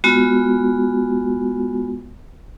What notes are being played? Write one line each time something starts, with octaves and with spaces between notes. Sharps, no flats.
G#3 B3 F4 F#4 G#5